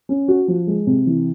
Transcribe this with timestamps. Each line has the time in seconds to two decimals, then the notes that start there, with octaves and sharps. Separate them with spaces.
0.09 C#4
0.28 F#4
0.48 F3
0.67 G#3
0.87 C3
1.06 E3